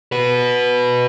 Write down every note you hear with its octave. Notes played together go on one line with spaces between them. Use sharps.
F#4 B4